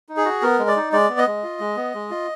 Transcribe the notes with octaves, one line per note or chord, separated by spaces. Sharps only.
D#4
G#4
F#4
B3 A#4
G#3
D5
D#4
G#3 D5
B3
D#5
G#3
F4
G#3
B3
G#3
F4